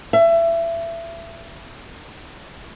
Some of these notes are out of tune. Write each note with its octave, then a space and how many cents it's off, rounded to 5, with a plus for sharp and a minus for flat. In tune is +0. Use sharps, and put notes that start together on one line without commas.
E5 +25